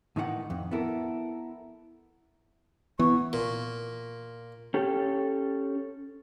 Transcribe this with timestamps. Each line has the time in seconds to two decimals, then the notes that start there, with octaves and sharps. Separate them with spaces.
0.16 A2 D#3 E3 D#4 G#4 F#5
0.50 F2
0.71 B3 E4 A4 A#4
2.99 E3 B3 C#6
3.33 A#2
4.74 C#4 G4 A4